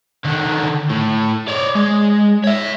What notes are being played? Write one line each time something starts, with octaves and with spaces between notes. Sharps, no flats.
D3 D#3
A2
C#5 D5
G#3
C#5 E5